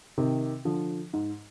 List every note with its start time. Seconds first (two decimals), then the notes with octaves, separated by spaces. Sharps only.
0.18 C3 D#3
0.65 D3 F3
1.13 G#2